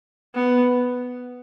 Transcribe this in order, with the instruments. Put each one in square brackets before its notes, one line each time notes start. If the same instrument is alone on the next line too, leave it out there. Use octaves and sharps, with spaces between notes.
[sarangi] B3